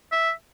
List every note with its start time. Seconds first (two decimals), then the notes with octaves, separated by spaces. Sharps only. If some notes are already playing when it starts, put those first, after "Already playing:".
0.12 E5